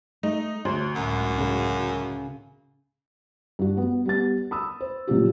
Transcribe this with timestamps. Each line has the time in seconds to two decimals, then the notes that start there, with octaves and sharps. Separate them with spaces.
0.23 A3 D#4
0.65 D2 C5
0.95 C#2 F#2 A2
1.38 C#3
3.59 G2 F#4
3.77 B3
4.06 G3 B3 A6
4.51 B5 D#6 E6
4.81 C5
5.07 A#2 C#3 F3 F#3 F4 G4